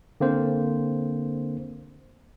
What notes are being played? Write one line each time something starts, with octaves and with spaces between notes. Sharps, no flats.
D3 A#3 C4 C5